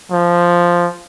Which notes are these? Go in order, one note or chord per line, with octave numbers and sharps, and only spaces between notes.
F3